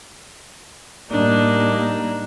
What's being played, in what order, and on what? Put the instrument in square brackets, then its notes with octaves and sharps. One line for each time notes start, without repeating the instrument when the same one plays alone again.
[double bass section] A2 G3 A#3 [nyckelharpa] D4 D#4